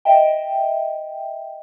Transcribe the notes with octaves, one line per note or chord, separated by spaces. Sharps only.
D#5 E5 G5